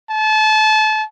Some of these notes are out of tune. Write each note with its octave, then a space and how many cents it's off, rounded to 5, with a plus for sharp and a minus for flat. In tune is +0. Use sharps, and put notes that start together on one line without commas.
A5 -30